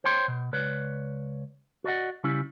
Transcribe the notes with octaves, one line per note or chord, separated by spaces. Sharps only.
C5 C#5 G5 C6
B2
C#2 B4 C#5 D5
F#4 D5 D#5 F#5
C#3 G3 C#4 E4